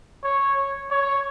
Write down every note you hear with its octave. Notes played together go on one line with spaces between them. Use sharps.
C#5
C#5